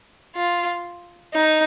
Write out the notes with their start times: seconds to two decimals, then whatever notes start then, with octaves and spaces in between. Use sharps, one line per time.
0.36 F4
1.34 D#4